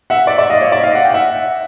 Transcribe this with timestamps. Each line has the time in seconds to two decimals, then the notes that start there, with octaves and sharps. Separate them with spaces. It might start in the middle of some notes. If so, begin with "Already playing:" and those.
0.10 E5 F#5
0.27 D5 E5
0.38 D5 E5
0.50 D#5 F5
0.61 C#5 D#5
0.72 D5 E5
0.84 D#5 F5
0.95 F#5
1.05 G5
1.14 E5 F#5